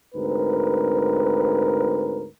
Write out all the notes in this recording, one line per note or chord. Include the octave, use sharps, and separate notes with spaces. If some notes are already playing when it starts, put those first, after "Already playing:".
D2 G#2 C4 A#4 B4